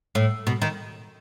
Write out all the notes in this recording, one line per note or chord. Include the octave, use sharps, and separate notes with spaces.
A2
B2
D#3